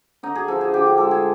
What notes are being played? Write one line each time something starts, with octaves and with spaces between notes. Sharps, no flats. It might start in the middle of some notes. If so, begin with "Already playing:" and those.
D3 D#4
G#4
F3 A4
G#4
D3 G4
G4
G#3 A4
G#4